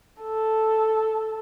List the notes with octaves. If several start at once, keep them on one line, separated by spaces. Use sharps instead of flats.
A4